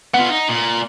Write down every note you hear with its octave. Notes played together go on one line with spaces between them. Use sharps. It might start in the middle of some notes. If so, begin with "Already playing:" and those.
B3 F4 F#5
D#4
A#2